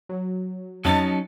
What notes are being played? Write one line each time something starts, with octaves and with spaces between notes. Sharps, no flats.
F#3
F2 F#3 C#4 D#4 D#5 A5 A6